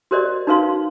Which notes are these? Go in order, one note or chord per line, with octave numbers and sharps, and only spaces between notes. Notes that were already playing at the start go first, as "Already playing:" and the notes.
F#4 G4 A#4 C5 D5 D#5
D#4 F#4 A#4 B4 F5 C6